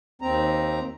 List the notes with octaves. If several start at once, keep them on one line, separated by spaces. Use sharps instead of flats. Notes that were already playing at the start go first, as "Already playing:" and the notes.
D#2 C4 A#5